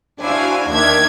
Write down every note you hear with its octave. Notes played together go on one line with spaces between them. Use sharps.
D4 E4 F#4 C5 F5 G#5
D#2 D#3 D4 E5 G#6